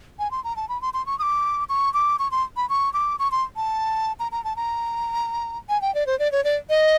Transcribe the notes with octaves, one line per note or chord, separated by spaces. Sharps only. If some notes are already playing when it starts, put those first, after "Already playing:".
G#5
C6
A#5
A5
B5
C6
C6
C#6
D#6
D6
C#6
D6
C#6
C6
B5
C#6
D6
C#6
C6
A5
A#5
A#5
A5
A#5
G#5
G5
D5
C5
D5
C#5
D5
D#5